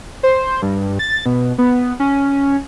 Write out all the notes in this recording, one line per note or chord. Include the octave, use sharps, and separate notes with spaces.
C5
G2
A6
B2
B3
C#4